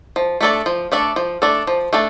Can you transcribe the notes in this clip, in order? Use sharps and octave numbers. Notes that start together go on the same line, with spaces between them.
F3
A3 D4 A4 D5
F3
A3 D4 A4 D5
F3
A3 D4 A4 D5
F3
A3 D4 A4